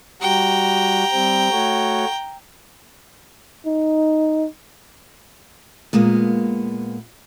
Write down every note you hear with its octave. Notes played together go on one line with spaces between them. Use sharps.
G3 F#4 G5 A#5
G3 C4
A3 F#4 C#5
D#4
A#2 G#3 A#3 B3